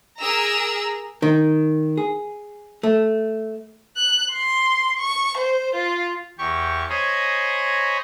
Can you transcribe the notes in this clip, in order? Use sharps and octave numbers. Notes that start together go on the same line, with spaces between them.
G#4 A#4 A#5 E6
D#3
G#4
A3
F#6
C6
C#6
C5
F4
E2 G4 C#6
C5 C#5 D#5 G#5 A#5 B5